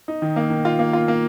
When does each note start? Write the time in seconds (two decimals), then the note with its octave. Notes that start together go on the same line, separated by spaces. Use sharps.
0.08 D#4
0.22 D#3
0.36 A#3
0.50 D#3
0.65 F4
0.79 A#3
0.93 F4
1.08 A#3